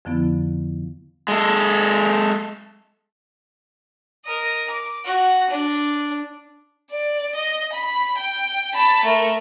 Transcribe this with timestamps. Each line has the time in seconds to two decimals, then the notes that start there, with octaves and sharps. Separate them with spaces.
0.05 F2 D3 F3 B3 E4
1.28 G#3 A4
4.25 A#4 D#5
4.70 D6
5.04 F#4
5.50 D4
6.90 D5
7.35 D#5
7.73 B5
8.18 G5
8.74 A5 B5
9.05 A3 A#4